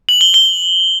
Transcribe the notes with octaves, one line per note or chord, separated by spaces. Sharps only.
F#7
G7
G7